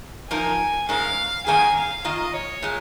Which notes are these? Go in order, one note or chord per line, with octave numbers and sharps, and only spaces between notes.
F3 A#3 D#4 A#4 G#5
G#2 G#3 C#4 A#4 F5
G#2 D#3 A#3 C#4 G#4 G#5
F5
D#3 A#3 F4 D#5
C#5
A#2 G#3